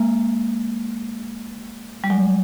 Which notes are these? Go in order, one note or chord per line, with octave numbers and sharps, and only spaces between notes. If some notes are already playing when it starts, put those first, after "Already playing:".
Already playing: G#3 A#3
G3
F#3 G#3